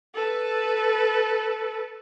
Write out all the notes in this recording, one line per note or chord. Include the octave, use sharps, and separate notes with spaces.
A4 B4